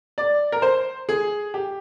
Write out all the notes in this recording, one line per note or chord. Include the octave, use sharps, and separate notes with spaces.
D5
A#4
C5
G#4
G4